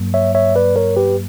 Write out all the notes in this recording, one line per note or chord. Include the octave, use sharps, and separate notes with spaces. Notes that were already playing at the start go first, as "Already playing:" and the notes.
Already playing: G2 F#3 A#3
C#5 E5
C#5 E5
B4 D5
A#4 C#5
G4 B4